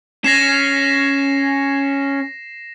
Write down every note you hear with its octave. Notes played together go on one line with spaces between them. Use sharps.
C#4 A#6 C7 E7